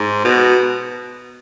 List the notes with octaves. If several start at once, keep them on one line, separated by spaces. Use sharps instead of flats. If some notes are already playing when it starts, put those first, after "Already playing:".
Already playing: G#2
B2